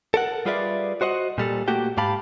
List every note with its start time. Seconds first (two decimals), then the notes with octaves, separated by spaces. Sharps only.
0.14 A4 A#4 F#5
0.46 G3 F4 G#4 B4 D5 E5
1.01 F#4 C5 D#5 E5 F#5
1.38 A#2 G3 A4
1.68 A3 A#3 F#4 G4 G5
1.97 G#2 G4 F5 A5 B5